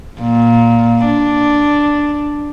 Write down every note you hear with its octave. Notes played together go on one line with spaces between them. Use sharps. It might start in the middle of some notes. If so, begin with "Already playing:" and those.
A#2
D4